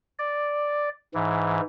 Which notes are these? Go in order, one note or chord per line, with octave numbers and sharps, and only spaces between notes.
D5
G#2 E3